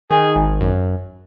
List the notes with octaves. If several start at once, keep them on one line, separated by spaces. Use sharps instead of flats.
D#3 G#4
G#1
F#2